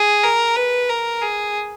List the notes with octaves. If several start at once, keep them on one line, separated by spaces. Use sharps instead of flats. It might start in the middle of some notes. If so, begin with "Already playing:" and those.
Already playing: G#4
A#4
B4
A#4
G#4